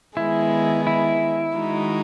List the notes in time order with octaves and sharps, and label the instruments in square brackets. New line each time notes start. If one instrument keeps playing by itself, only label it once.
[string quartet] D#3 G#3 B3 [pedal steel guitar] E4
[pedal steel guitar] E4
[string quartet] D#3 G#3 D#4 F#4